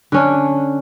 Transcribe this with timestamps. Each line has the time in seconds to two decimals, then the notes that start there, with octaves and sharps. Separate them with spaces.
0.12 D3 C#4 D4